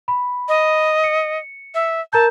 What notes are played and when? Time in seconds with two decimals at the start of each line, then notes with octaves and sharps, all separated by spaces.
0.08 B5
0.48 D#5
1.04 C#7
1.74 E5
2.13 A#4 A5 A#5 G6